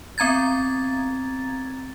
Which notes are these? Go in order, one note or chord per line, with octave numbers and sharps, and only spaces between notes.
B3 C4 A#5 G#6 A6